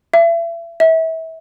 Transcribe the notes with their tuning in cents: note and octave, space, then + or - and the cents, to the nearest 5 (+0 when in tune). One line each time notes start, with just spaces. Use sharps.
E5 +35
E5 -30